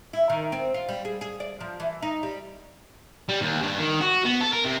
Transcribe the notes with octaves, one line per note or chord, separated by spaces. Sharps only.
E4
D#3
C4
F4
G3
G#4
G#4
D5
F3
E3
D#4
G3
G3
D#2
G2
D#3
F#4
B3
A4
A#4
C3